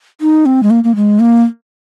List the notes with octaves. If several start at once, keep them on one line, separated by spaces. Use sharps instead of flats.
D#4
C4
G#3
A#3
A#3
G#3
A#3